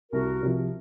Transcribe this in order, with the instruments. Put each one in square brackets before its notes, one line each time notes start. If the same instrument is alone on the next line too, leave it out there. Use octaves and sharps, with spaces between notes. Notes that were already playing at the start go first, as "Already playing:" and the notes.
[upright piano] C2 [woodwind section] F#4 A#4
[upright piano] C3 F3